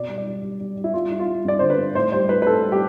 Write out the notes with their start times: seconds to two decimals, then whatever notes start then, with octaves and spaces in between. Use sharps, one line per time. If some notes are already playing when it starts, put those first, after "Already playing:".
Already playing: B2 D5
0.08 G3
0.18 D5
0.26 G3
0.43 G3
0.60 G3
0.77 G3
0.84 E4
0.94 G3 F4
1.10 G3 E4
1.19 F4
1.27 G3
1.45 G2 D5
1.59 D3 C5
1.70 B4
1.78 G2
1.95 A2 C5
2.12 G3 C5
2.29 A2 B4
2.42 B4
2.46 A2 A4
2.63 G3
2.72 G4